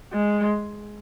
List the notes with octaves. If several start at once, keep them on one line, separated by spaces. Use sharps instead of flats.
G#3